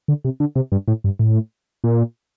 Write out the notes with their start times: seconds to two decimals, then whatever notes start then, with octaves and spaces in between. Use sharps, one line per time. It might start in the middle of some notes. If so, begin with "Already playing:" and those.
0.08 D3
0.25 C3
0.40 D3
0.56 C3
0.72 G2
0.88 A2
1.04 G2
1.19 A2
1.84 A#2